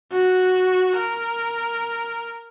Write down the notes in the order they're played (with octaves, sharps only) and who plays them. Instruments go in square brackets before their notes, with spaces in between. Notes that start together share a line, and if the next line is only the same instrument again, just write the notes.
[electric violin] F#4
A#4